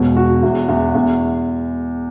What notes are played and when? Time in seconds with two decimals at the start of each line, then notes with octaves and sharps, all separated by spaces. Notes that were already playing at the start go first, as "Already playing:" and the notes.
Already playing: E1 B2
0.17 F#4
0.43 E2
0.69 E2
0.95 E2